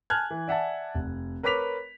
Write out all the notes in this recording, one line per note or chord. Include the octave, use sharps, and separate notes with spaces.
G#5 A5 F6 F#6 G#6
E3
D5 E5 F#5 G#5 A5
F1
A#4 B4 C#5 D6 B6 F7